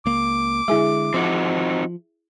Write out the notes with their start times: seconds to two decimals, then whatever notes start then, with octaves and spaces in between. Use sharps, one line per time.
0.06 C#2 A#3 D6
0.68 D3 G#3 E4 G#4 E5
1.14 F3 C4 D#4 F#4